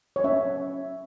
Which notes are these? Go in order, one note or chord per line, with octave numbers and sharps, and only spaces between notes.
C#5
C#4 E5